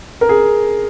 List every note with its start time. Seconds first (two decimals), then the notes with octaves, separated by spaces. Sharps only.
0.21 A#4
0.29 G#4